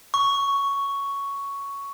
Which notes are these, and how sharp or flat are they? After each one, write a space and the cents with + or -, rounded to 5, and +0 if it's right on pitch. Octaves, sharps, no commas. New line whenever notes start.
C#6 +5